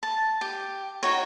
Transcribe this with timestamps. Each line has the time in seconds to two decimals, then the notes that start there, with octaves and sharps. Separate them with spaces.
0.03 A5
0.41 G4
1.03 D#4 F#4 C#5